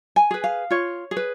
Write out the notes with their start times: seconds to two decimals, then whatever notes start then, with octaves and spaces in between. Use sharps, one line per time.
0.16 G#5
0.31 G#4 B4
0.44 F5
0.71 F4 C#5
1.11 G#4
1.17 B4